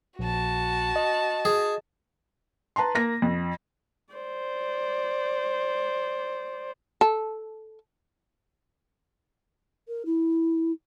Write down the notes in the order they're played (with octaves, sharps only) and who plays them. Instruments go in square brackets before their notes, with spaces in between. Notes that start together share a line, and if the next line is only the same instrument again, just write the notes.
[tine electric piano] A#1 [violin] F#4 A5
[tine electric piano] D#5
[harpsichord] G#4
[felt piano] B4 A5 A#5 C6
A#3 A#6
F2
[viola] C5 D5
[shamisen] A4
[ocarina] A#4
E4